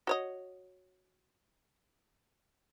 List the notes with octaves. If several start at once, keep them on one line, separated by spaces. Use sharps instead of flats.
F#4 C#5 D#5